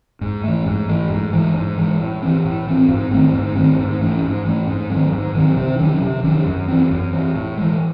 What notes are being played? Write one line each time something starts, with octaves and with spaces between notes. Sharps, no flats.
G#2
E3 A3
G#2
E3 A3
G#2
E3 G#3
G#2
E3 G#3
A2
E3 C4
A2
E3 C4
G#2
D#3 A3 C4
G#2
D#3 A3 C4
G#2
E3 A3 C#4
G#2
E3 A3 C#4
G#2
D#3 F#3 C4
G#2
D#3 F#3 C4
C3
D#3 F#3 C#4
C3
D#3 F#3 C#4
F#2
E3 C4
F#2
E3 C4
A2
E3 G#3